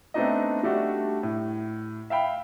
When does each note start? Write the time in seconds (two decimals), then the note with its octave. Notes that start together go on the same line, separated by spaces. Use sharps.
0.14 A3 B3 C4 D4 D#4 D#5
0.63 G3 A3 D4 F#4
1.23 A2
2.10 E5 F5 G5 B5